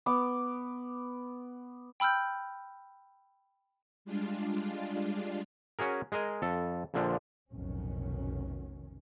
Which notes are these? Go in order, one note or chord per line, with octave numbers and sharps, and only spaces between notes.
B3 D6
G5 B5 E6 F6 G6
G3 G#3 D4 F4
C#4 F#4 G#4 A#4
G#3 G#4 A#4 D#5
F2 A4
A#1 A#2 D3 F3 D4
F1 B1 A2 D#3 F#3 C#4